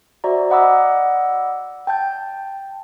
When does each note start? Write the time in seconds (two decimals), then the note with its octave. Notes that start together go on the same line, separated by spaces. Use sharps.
0.24 F#4 C5 D5 E5 A#5
0.50 D5 D#5 F#5 B5 D6 E6
1.87 G5 A5 G6